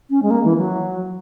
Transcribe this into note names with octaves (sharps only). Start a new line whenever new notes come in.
C#4
G#3
A#3
E3
F#3